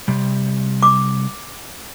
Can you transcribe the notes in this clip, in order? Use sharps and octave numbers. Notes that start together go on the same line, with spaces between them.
C3 G3
D6